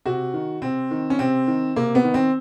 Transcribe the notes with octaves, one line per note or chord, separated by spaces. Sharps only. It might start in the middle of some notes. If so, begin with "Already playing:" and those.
C3 F#4
D#3
C3 C4
D#3
C#4
C3 C4
D#3
C3 A#3
B3
D#3
C4